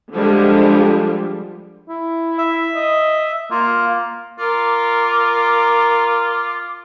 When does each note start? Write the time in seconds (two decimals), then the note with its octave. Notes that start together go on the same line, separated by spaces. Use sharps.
0.13 D3 F3 G3 G#3 D4 G4
1.88 E4
2.38 E5
2.76 D#5
3.51 A#3 F4
4.39 F4 A#4 D6